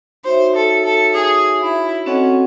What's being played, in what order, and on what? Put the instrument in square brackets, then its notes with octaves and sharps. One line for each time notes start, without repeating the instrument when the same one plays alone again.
[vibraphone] D#4 F#4 C#5 E5 [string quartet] C5
[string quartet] A4
A4
G#4
E4
[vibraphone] C4 F#4 A4 D#5 F#5 [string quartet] C#4